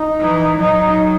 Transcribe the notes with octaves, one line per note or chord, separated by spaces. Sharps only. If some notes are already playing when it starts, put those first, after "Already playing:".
Already playing: D#4
E3
F#3 D#4